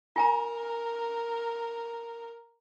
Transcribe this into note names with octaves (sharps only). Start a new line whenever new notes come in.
F4 A#4 G#5 A#5